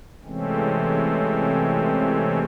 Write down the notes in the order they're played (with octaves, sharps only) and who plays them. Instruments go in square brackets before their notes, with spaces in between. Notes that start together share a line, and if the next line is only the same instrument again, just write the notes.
[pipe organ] C3 E3 G#3 A3 C4 C#4